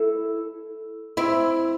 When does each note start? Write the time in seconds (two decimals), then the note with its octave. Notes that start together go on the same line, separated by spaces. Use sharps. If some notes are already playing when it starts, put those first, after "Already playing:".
Already playing: E4 A4
1.17 C4 E4